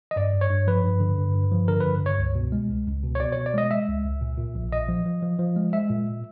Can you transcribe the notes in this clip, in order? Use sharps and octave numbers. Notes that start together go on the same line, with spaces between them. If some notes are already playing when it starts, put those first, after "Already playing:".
D#5
G2 D5
G2
C#5
G2
F3 B4
G2
D3
G2
G2
F3
D3 A#4
G2 B4
G2 C#5
C#2
B2
G#3
C#2
C#2
B2
C#5
B2 D5
B2 C#5
D5
G#3 D#5
G#3 E5
C#2
C#2
A#2
A#2
A#1
A#2 D#5
F3
F3
F3
F3
G#3
G#3 E5
A#2